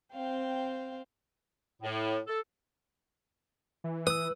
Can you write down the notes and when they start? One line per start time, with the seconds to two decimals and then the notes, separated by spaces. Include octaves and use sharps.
0.13 C4 C5 F5 G5
1.83 A2
2.27 A4
3.84 E3
4.07 B4 D#6 E6